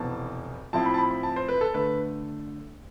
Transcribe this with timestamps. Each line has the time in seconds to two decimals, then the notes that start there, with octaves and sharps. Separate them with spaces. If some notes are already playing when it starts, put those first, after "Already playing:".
Already playing: F1 E2 B2 A5
0.73 A2 F3 C4 E4 A5
0.86 B5
0.94 A5
0.98 B5
1.11 B5
1.23 A5
1.36 C5
1.48 B4
1.61 A4
1.74 D3 A3 B4